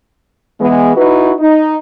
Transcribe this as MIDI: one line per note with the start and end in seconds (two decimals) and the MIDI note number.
0.60 0.95 52
0.60 0.95 56
0.60 0.95 59
0.96 1.33 63
0.96 1.33 64
0.96 1.33 66
0.96 1.33 71
1.39 1.77 63